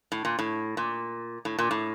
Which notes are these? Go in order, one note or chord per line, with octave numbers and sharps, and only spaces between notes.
A2
A#2
A2
A#2
A2
A#2
A2